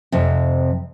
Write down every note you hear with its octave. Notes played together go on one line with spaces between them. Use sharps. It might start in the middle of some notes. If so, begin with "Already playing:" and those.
F2 C3